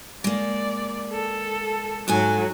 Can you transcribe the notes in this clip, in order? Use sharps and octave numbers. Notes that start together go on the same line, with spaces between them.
G#3 A#3 D5
A4
G#2 F#3 A4 G#5